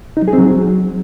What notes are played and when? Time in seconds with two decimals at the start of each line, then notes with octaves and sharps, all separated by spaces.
0.17 D#4
0.22 F#3
0.28 G#4
0.33 C4
0.38 F#3